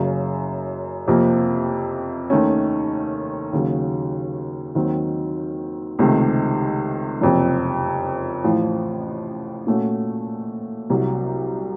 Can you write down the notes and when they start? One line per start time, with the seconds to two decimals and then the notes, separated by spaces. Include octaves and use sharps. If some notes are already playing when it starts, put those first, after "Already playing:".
Already playing: F#1 F#2 C#3
1.07 F2 C3 F3 A#3
2.30 D#2 D#3 A3 C#4
3.53 D#2 C#3 F#3
4.75 D#2 D#3 F#3 C4
5.99 C#2 C3 D#3 A3 C4
7.21 F#1 F2 C3
8.44 A1 A2 F3
9.67 A#2 A3 C#4 F#4
10.90 C2 C3 F#3